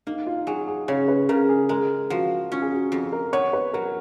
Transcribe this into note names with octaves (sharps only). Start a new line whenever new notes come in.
A#3 D#4
F4
F#3 G#4
G#4
C#3 C#5
B4
C#3 A#4
G#4
G#3 A#4
F3 F#4
C#4 F4
G#4
F#4
F2
A#4
B3 C#5
B4
F#3 A#4